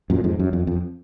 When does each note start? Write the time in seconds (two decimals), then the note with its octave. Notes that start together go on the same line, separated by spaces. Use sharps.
0.10 F#2 A#2
0.24 F2 G#2
0.39 F#2
0.53 F2
0.67 F2